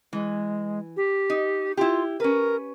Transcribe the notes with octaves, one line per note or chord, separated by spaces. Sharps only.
E3 G#3
G4
D#4
E4 F4 G4
C#4 A#4 B4